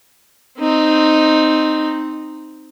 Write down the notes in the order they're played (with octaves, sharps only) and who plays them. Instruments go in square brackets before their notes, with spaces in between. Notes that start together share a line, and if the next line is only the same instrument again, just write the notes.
[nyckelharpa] C4 D#4